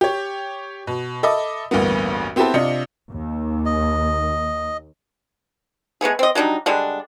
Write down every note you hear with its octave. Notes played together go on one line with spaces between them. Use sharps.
G4 C#5
B2
A4 D#5 E5 B5 D6
A1 D2 G2 A#3 B3
B3 C4 E4 G4 A4 B4
C3 D4 F4 D#5 C#7
D#2
D#5
G#3 A3 B3 G#4
C4 D#5
F#3 G3 D4 D#4
D3 G3 G#3 D4